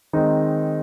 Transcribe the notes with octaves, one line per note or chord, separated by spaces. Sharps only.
D#3 G#3 C4 D#4